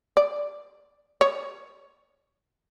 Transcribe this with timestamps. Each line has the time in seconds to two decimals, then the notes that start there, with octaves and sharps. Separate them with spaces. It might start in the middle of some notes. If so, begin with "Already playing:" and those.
0.17 D5
1.21 C#5